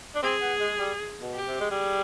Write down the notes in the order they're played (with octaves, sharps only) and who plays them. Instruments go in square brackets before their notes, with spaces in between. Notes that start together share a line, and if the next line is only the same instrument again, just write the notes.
[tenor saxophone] D4
[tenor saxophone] C4 [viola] G#4
[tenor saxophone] B3
G#3
G3
B2
[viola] G4
[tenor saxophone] C3
G#3
[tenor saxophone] G3 [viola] G#4